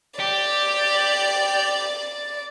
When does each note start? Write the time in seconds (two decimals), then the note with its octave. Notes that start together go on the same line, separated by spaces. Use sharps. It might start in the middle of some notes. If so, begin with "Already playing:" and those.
0.20 G4 D5